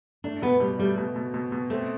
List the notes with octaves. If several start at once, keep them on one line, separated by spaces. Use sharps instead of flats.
A3 D4
B2 B3
B2 G3
G3 A3
B2
B2
B2
B2
A3 C4